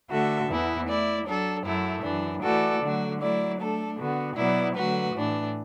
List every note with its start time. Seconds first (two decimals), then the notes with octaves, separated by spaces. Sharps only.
0.10 D3 A3 F#4 A4 E5
0.49 E2 E3 B3 E4
0.87 A3 E4 D5
1.26 F#3 D4 A4
1.65 F#2 F#3 A3 E4
2.04 F#2 E3 D4
2.42 E3 A3 F#4 A4 D5
2.82 D3 F#3 A3 F#4
3.20 F#3 A3 E4 D5
3.59 A3 D4 A4
3.98 D3 B3 F#4
4.37 B2 F#3 B3 E4 D5
4.76 D3 F#3 A3 F#4 B4
5.14 A2 E3 D4